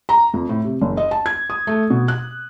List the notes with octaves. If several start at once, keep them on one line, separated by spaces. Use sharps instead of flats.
A#5
F2
A2
C3
F#1
D#5
A5
G#6
D#6
A3
B2
F#6